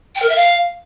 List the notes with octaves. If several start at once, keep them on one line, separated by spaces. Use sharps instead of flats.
G5
A#4
E5
F5